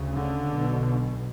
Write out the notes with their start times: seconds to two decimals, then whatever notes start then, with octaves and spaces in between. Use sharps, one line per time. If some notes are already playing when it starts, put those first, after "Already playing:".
Already playing: D2 C#3
0.15 D3
0.51 B1 B2